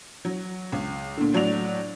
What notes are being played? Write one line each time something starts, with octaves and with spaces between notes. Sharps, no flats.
F#3
C#2
A#2 D3
A2 F#3 D4 D5 F7